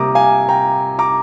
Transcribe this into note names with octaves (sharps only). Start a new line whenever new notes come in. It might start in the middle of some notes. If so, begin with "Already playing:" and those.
Already playing: C3 G3 A#3 A#5 D6 D#6
F5 G#5
G5 A#5
A#5 D6